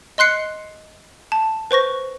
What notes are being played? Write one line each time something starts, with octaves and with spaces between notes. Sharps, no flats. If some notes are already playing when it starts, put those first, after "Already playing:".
D#5 C6 F#6 C7 C#7
A5
B4 C5 C#6 A#6